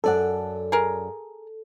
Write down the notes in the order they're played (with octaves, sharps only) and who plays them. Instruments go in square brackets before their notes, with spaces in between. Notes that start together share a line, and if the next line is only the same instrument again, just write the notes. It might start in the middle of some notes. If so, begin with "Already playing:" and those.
[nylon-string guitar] F#2 D5 F#5 [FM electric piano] A4
[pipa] G#4 A#4